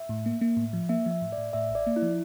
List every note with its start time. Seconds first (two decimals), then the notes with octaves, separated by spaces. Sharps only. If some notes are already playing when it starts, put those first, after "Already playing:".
Already playing: E5
0.09 A2
0.26 A#3
0.41 A#3
0.57 A2
0.73 F3
0.89 A#3 E5
1.06 F3
1.11 E5
1.22 A2
1.32 D5
1.38 A2
1.53 A2 E5
1.70 A1
1.75 D5
1.87 A#3
1.96 E4
2.02 F3